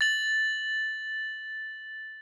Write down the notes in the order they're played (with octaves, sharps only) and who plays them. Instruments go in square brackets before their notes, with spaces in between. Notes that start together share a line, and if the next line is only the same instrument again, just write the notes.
[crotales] A6 F#7